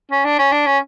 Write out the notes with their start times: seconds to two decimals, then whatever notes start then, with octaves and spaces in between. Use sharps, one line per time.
0.11 C#4
0.25 D4
0.39 C#4
0.52 D4
0.66 C#4